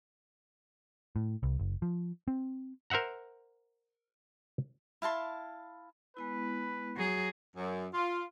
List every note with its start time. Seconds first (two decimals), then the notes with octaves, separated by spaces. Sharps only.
1.16 A2
1.43 C2
1.59 F#1
1.82 F3
2.28 C4
2.90 A#4 C5 E5 F#5 A#5
5.02 E4 F5 A5 C6
6.17 G#3 B3 E4 B4
6.96 F#3 G#4
7.57 F#2
7.94 F4